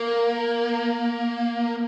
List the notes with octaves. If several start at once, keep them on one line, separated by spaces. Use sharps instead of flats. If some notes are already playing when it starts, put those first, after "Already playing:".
Already playing: A#3